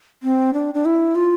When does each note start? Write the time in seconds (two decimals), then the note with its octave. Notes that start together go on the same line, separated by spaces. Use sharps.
0.23 C4
0.54 D4
0.74 D4
0.85 E4
1.15 F4